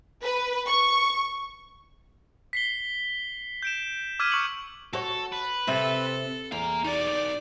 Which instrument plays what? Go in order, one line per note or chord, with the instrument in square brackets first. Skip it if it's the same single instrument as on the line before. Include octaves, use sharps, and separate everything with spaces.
[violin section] B4
C#6
[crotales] B6 C7 G7
G6 D7 E7
D6 E6 F6 G#6 B6 D#7
C#6 E6 F6 C#7 F#7
[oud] F#4 C#5 [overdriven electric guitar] A4
[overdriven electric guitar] B4
[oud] C3 C4 E5 [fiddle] A4
[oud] E2 [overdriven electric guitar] A#3 A#5
[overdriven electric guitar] B1 D#4 [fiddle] D5